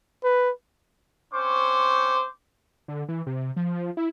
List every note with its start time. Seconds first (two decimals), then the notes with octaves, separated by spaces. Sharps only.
0.24 B4
1.33 C4 C#4 C5 C#6 D6
2.88 D3
3.09 E3
3.27 C3
3.56 F3
3.97 E4